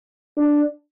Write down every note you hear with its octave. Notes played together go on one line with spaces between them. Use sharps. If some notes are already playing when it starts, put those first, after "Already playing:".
D4